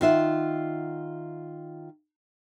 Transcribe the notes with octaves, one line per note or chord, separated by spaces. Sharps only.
D#3 F4 E5 F#5